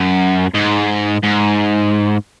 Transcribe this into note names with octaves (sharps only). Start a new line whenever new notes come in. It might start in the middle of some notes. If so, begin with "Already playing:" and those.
Already playing: F#2
G#2
G#2